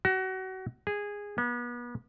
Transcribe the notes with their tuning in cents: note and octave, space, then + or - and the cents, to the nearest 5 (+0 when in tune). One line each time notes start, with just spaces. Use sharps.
F#4 +30
G#4 -15
B3 -35